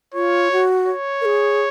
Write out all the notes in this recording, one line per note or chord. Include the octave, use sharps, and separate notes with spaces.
F4 C#5
F#4
C#5
A#4
G#4